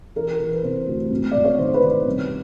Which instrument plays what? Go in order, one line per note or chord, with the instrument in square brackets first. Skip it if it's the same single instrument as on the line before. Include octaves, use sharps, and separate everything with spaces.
[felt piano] E3 A#4
A#4
E3 A4
B4
C3 C5
D2
G#1
G#1 D5
C#5
D#3 C5
B4
D#3
C2